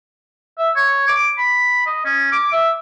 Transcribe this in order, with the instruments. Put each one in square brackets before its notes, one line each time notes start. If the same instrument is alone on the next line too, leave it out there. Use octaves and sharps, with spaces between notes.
[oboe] E5
C#5
D6
B5
D#5
C#4
D6
E5